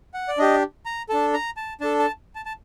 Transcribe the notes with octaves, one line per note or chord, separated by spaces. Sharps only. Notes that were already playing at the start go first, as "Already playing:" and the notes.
F#5
D5
D4 G4 D#5
A#5
D4 A4 A5
A#5
A5
D4 A4 A5
A5
A5
A5